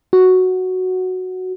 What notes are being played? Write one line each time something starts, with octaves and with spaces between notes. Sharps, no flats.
F#4